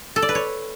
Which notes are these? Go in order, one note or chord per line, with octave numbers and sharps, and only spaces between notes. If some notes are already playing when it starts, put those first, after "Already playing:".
A4
D5
B4
C#5